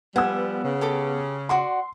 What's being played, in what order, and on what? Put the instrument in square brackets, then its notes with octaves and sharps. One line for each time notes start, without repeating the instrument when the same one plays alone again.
[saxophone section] F3 G3 [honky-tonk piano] B3 E6 [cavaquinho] F#5 G#5
[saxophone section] C#3
[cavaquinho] G4 A4 D6
[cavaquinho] F#4 D5 F#5 [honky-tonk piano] C6